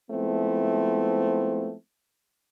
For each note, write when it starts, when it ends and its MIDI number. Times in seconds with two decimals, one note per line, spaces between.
0.11 1.74 53
0.11 1.74 56
0.11 1.74 57
0.11 1.74 59
0.11 1.74 60
0.11 1.74 64